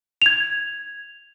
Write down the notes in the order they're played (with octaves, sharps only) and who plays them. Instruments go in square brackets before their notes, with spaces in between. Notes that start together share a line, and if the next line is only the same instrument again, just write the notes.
[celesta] G#6 F7